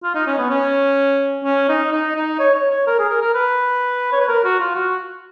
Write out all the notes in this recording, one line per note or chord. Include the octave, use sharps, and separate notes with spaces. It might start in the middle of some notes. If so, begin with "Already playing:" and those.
F4
D#4
C#4
B3
C#4
C#4
D#4
D#4
D#4
C#5
C#5
C#5
A#4
G#4
A#4
A#4
B4
C#5
B4
A#4
F#4
F4
F#4